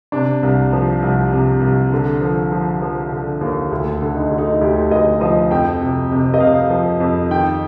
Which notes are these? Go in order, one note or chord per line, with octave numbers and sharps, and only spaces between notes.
C3 D4
C2
F3
C2
C3
C2
D3
F3
F3
F3
D3
D#2
D2
D3
D#4
D2
D#4
D2 G4
D2 D#5
F3 D#5
F2 G5
C3
C3
D#5
C3 F5
F3
F2
D#3 G5